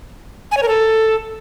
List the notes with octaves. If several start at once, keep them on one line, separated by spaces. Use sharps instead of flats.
G#5
C#5
A#4
A4